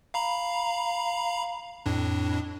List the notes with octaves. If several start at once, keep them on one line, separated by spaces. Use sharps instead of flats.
F5 A#5 B5
F2 A2 D4